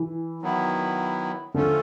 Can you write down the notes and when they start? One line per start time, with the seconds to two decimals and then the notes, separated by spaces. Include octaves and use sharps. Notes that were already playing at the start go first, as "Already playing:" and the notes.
Already playing: E3
0.42 D#3 F#3 B3 E4
1.54 D3 F3 A3 C#4 F4 A4